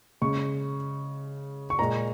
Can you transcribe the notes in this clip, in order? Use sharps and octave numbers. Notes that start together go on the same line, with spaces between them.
C#3 G#3 C#6
C#6
A#2 G#3 A#5